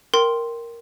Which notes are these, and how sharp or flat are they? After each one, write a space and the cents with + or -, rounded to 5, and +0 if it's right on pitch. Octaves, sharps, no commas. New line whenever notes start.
A#4 +0 G5 -10 C6 +0